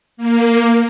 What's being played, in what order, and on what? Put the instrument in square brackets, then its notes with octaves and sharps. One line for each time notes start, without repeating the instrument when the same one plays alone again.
[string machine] A#3